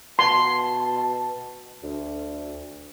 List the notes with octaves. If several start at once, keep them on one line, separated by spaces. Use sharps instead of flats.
B2 A5 C6
D2